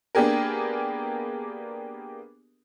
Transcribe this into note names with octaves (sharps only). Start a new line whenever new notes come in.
A#3 B3 D4 G4 G#4 A#4